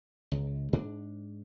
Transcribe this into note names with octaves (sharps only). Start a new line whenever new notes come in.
C#2
G#2 D4